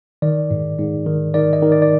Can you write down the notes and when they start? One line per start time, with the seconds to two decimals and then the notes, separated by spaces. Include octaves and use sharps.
0.22 D#3 D5
0.51 G#2
0.79 G#2
1.07 D#3
1.34 D#3 D5
1.53 D#5
1.62 D#3
1.72 D5
1.82 D5